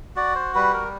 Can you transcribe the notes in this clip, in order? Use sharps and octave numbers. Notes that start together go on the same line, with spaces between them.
F#4 D5
C5
G3 B4
A#4